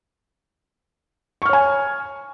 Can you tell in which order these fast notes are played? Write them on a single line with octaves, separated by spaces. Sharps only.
C#6 F6 C#5 G#5